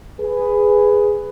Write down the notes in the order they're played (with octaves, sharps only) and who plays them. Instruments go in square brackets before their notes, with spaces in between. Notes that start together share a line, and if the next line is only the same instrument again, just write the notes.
[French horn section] G#4 B4